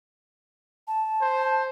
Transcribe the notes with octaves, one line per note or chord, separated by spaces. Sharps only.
A5
C5